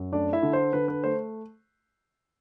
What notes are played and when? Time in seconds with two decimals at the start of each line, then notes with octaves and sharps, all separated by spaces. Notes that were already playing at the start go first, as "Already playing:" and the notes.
Already playing: F#2
0.13 A3 D4 D5
0.33 E4 E5
0.43 D3
0.53 C5
0.73 D3 B4
0.88 B4
1.04 A3 C5